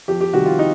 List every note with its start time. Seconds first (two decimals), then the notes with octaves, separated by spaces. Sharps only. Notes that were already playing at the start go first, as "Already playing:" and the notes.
0.08 F2 G4
0.21 G4
0.33 C3 D#3 G3 F#4
0.46 F4
0.59 D#4